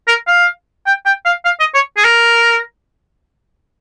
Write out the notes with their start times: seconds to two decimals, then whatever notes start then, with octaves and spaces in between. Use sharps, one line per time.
0.08 A#4
0.28 F5
0.86 G5
1.06 G5
1.26 F5
1.45 F5
1.60 D#5
1.74 C#5
1.97 G#4
2.04 A#4